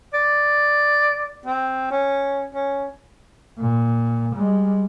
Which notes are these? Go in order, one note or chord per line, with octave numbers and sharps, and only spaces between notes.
D5
C4
C#4
C#4
A#2
G3 G#3